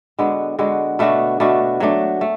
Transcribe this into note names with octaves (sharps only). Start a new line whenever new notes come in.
D3 G#3 B3 F#4
D3 G#3 B3 F#4
B2 A3 D4 F#4
B2 A3 D4 F#4
F#3 A3 D4
A3